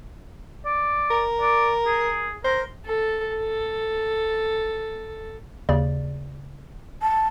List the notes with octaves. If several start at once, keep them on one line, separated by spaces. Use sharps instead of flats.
D5
A#4
D5
G#4
A#4 C5
A4
A4
D#2 C#3 D5
A5